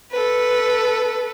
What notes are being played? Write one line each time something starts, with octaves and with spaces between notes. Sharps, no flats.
A4 B4